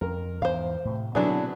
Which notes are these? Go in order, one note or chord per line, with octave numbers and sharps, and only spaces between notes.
F2 A#4
E2 G#2 E3 C5 F5
A2 C3
B2 D3 F#3 B3 C4 D4 E4 G#4